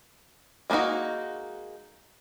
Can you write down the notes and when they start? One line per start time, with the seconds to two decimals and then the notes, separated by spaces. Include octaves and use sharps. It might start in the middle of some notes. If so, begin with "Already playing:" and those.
0.70 G#3 A#3 D4 D#4 F#4